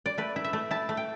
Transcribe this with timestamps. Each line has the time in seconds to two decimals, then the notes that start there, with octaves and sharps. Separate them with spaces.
0.06 D5
0.18 A3 B4
0.36 E4
0.44 E5
0.53 A3
0.71 E4 A5
0.89 A3
0.97 G5